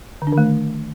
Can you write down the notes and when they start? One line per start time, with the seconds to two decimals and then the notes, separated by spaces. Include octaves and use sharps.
0.22 D3
0.27 D4
0.32 D#3
0.38 A3